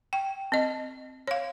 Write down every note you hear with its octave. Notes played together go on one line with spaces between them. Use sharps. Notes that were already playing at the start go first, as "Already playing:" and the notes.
G5
C4 D#5
C#5 F5